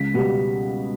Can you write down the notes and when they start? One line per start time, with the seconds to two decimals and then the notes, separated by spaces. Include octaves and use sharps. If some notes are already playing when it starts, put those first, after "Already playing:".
Already playing: C#2 B6
0.14 B2 G3 B3